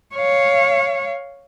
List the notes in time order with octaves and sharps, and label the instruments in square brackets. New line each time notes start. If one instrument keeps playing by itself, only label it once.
[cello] C#5 F5